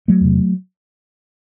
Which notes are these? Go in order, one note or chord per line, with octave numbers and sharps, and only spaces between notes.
F#3 A3
E2 C3